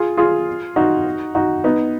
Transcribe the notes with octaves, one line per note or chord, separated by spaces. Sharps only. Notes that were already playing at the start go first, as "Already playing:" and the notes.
Already playing: F4 G#4
F4 G#4
D#4 F#4
D#4 F#4
B3 D#4